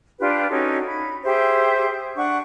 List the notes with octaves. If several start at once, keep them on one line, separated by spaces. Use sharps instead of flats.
D4 F4 G4 B4
C#4 D#4 F#4 A4
B5
G4 G#4 C5 E5
D4 F#5 C#6